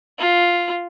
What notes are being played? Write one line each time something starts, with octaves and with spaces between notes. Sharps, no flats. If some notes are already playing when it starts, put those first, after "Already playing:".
F4